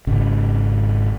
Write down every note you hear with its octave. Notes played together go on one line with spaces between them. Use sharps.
G#1 C#3